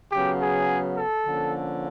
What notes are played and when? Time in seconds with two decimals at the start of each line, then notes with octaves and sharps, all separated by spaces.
0.11 C#3 F#3 B3 G4
0.40 G#4
0.97 A4
1.25 D3 F3 A#3 C#4